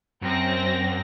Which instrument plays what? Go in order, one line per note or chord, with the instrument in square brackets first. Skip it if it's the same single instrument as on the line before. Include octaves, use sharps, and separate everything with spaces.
[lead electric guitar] F#2 [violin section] C4 A#6